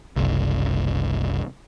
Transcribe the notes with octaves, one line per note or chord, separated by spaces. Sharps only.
F#1 C2